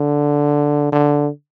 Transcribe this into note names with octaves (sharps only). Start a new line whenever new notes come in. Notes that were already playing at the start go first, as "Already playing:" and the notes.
Already playing: D3
D3